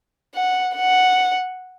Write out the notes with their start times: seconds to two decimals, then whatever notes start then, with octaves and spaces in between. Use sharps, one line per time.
0.35 F#5
0.76 F#5